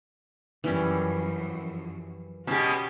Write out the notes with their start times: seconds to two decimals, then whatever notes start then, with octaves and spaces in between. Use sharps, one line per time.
0.64 F#2 E3 F3 G3 C#4
2.47 B2 G#3 C#4 F#4 G4